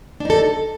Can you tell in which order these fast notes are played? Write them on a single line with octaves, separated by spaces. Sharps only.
D4 D#4 A4